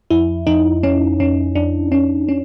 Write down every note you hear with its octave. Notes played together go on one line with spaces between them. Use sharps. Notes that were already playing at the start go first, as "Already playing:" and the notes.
F2 E4
F2 D#4
F2 C#4
F2 C#4
F2 D4
F2 C#4
C#4